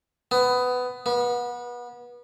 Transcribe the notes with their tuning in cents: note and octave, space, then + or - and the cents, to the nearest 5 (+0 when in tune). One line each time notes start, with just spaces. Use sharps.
B3 +15
B3 -30